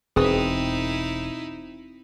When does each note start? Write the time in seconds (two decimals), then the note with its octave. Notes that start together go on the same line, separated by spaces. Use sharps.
0.16 E1 C4 D#4 E4 G#4 B4 D#6